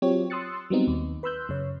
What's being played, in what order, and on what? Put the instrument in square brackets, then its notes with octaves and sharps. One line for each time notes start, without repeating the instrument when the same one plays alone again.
[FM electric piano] F#3 C4 F4 G4 C#5
C6 D#6 E6 F#6 A6 C#7
F#3 G3 B3 C4 D#4
D#2
B4 B5 C6 E6 F#6 G6
F#2 C#3 C#5